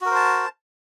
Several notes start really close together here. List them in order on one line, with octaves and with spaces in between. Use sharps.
F#4 A#4 C5 A5